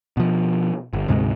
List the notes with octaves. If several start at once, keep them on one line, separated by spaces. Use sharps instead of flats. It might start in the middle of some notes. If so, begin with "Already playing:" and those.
B2 F3
G1
D2 G#2 C3 G#3